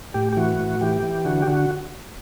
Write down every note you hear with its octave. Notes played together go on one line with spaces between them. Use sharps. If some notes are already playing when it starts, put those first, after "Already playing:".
A2 G4
G4
E3 F#4
A2
E3 G4
E3
D3 F#4
G4
D3 F#4